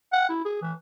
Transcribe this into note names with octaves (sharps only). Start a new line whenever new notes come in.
F#5
E4
G#4
E3